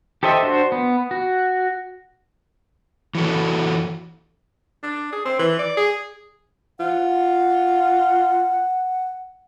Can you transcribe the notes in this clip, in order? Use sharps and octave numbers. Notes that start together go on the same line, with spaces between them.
G4 A4 C5 D#5 E5
D4 F#4 C5
B3
F#4
E3 F#3 F#4 A4
D4
G#4
C4
E3
D5
G#4
F4 F#5